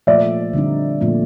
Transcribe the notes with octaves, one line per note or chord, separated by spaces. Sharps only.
A#2 F3 A3 D5 E5
D3 G3 C4 D#4
A#2 F3 A3 C4